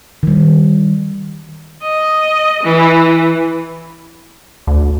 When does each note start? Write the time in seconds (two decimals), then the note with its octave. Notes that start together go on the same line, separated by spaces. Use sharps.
0.23 D#3 G3
1.82 D#5
2.64 E3
4.67 D2